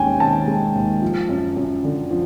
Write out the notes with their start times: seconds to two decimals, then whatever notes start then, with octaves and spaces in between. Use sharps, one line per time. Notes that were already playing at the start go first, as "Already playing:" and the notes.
Already playing: D#2 G#3 C#4 G5 G#5
0.20 D#3 A5
0.48 G#3
0.75 D#2
1.02 F3
1.29 F#2
1.57 F#2
1.84 D3
2.11 F3